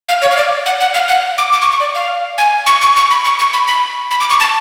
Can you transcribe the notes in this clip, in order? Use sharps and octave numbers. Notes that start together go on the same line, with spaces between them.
F5
C#5
F5
D5
F#5
F#5
F5
F#5
D6
D6
C#6
C#6
D5
F5
G#5
C#6
C#6
C#6
B5
C#6
C#6
B5
B5
B5
D6
C#6
A5